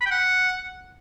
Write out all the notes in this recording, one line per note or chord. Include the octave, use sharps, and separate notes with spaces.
B5
G5
F#5